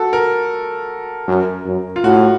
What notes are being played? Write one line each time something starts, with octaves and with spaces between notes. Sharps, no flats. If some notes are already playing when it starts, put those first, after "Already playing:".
Already playing: F#4 A4
A#4
F#2
F#2
F4
A2 F#4